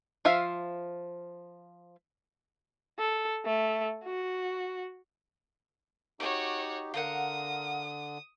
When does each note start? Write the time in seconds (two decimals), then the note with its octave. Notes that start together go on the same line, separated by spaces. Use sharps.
0.25 F3 F4 E5 F5
2.99 A4
3.45 A3
4.04 F#4
6.20 D#4 F#4 G4 C#5 D6
6.94 D3 F4 A#4 F#5 D#6